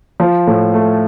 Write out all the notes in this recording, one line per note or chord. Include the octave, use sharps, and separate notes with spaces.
F3
A2
A3